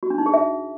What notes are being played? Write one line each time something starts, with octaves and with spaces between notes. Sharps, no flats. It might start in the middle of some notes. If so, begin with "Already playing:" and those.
F#4
D4
D#4
G#4
E5